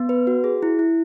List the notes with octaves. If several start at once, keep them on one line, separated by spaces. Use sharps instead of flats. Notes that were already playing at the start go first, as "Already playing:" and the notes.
Already playing: B3
B4
F#4
G#4
E4
E4